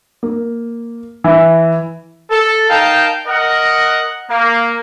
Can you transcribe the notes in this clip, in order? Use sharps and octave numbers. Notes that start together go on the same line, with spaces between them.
A#3
E3
A4
D#4 A#4 F5 G5 A5
A#4 D#5 F#5
A#3